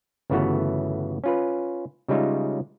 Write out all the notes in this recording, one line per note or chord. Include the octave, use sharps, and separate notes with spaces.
G1 C#3 E3 A3 B3 F#4
C#4 F4 B4
C#3 G3 G#3 D#4 F4 E5